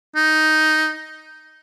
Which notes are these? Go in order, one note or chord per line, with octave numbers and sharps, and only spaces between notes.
D#4